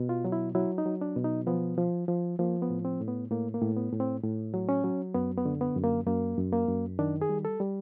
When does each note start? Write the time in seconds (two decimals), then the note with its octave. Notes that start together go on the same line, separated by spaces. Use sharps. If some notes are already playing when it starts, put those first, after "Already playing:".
Already playing: B2
0.09 F4
0.25 F#3
0.32 E4
0.55 F#3 E4
0.78 D#4
0.86 F#3
1.01 D4
1.16 B2
1.24 D#4
1.47 F3 B3
1.78 F3
2.08 F3
2.39 F3 A#3
2.62 B3
2.70 A2
2.85 C4
3.01 A2
3.08 B3
3.31 A2 A#3
3.54 A#3
3.62 A2
3.77 B3
3.92 A2
4.00 C4
4.23 A2
4.54 F#3
4.69 C#4
4.84 F#3
5.14 F#2 B3
5.38 B3
5.46 D3
5.61 B3
5.76 F#2
5.84 A#3
6.07 F#2 A#3
6.38 F#2
6.53 A#3
6.68 F#2
6.99 D#3 D4
7.22 G#4
7.29 G3
7.45 A4
7.60 G3